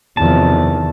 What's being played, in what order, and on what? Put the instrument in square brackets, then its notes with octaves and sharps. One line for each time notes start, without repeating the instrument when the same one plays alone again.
[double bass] E2 [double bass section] C3 D#3 F3 [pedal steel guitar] A5